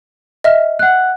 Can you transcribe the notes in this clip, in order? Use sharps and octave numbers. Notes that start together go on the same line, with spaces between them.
D#5 E5 F6
F#5 F#6